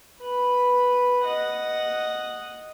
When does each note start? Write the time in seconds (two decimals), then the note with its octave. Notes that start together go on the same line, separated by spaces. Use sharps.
0.20 B4 B5
1.24 D#5 F#5